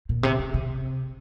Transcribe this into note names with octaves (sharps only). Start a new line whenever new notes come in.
A#2
C3
C3
C3